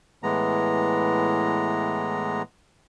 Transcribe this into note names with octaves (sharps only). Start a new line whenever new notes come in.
A2 E3 G#3 B3 A#5